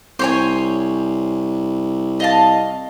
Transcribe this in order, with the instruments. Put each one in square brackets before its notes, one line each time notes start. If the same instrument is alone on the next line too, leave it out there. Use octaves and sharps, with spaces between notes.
[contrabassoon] C2 [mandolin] C5 C#5 G#5
[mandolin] D#5 F5 A5